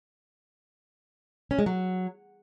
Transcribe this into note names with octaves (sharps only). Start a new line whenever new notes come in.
C#4
G#3
F#3